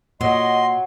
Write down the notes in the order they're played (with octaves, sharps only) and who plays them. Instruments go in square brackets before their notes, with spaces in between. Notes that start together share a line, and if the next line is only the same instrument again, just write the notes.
[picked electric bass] A#2 [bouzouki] F#3 [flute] D#5 [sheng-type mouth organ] C6